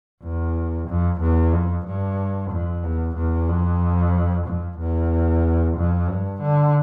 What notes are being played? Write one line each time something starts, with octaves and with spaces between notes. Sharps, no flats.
E2
F2
E2
F2
G2
F2
E2
E2
F2
F2
E2
F2
G2
D3